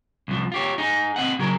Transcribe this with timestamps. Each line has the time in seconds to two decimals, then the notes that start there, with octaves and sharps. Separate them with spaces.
0.28 C2 F3
0.52 F4 G4 C#5
0.78 D#4 G#4
1.16 C4 D#5 F#5
1.39 C#3 F#3 G#4 A#4